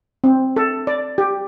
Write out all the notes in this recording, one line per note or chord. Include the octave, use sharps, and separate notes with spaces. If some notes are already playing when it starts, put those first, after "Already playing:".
C4
A4
D5
G4